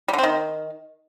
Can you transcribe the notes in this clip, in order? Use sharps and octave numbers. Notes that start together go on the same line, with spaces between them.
G3
D3
C4
D#3